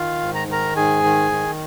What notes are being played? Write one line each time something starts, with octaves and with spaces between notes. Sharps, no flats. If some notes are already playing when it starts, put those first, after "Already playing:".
Already playing: D#3 F4 F5
G#2
A#5
D#3 A#4 A#5
G#2 G#4 G#5
D#3
D#3